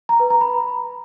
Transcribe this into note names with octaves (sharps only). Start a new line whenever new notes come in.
A#5
B4
A#5
B5